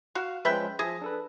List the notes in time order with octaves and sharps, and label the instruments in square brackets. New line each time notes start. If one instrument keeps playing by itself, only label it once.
[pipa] F#4 [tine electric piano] F5
[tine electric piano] F3 G#3 C#4 [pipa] B4 E5 G5
[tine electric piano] F3 E5 A#6 [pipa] G#4
[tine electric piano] D4 A4 B4